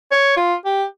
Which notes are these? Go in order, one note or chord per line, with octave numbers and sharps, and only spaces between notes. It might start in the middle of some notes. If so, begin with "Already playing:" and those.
C#5
F4
G4